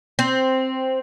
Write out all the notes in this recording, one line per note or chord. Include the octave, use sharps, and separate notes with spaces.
C4